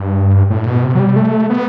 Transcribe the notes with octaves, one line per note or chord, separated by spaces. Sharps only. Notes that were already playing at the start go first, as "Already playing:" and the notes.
Already playing: G2
A2
B2
C3
F#3
G3
A3
B3